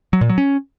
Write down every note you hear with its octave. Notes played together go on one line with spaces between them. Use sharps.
F#3
A#2
F#3
C#4